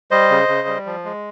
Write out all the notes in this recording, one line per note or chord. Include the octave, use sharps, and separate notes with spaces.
G3 C5 D#5
C#3
C#3
G3
F3
G#3